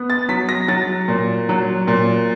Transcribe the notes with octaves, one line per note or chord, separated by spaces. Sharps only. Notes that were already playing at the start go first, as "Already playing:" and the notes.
Already playing: B3
A6
F#3 B6
A#6
F#3 A6
A#2
F#3
A#2